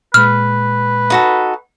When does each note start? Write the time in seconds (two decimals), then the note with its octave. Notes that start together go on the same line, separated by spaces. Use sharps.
0.14 A#2 G#3 B4 F6
1.10 D#4 F#4 A4